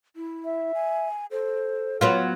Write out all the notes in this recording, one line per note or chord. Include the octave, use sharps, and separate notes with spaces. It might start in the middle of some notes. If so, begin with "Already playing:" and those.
E4
E5
G#5
A4 C5
F#3 B3 F4 F#5